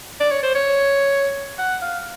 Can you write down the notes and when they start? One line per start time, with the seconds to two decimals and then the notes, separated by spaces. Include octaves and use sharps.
0.20 D5
0.31 C#5
0.43 C5
0.55 C#5
1.59 F#5
1.82 F5